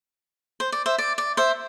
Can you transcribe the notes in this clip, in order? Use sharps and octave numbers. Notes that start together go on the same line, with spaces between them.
C5
D5
C5 E5
D5
D5
C5 E5